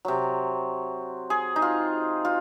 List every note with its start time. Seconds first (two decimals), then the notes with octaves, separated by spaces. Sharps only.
0.05 C3 F#3
1.30 G#4
1.56 D#4
1.62 F4
2.25 F4